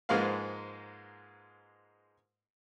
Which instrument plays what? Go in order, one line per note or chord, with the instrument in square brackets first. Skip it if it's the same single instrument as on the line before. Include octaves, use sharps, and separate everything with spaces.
[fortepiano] G#2 F3 G#3 A#3 B4 F5